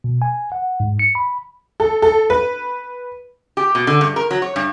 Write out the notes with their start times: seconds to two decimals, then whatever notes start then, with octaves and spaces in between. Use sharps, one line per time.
0.04 B2
0.22 G#5
0.52 F#5
0.80 G#2
0.99 C#7
1.15 B5
1.80 A4
2.02 A4
2.30 B4
3.57 G4
3.75 B2
3.87 D3
4.01 G2
4.16 A#4
4.31 F#3
4.42 C#5
4.56 G2